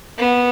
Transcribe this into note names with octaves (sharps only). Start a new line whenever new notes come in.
B3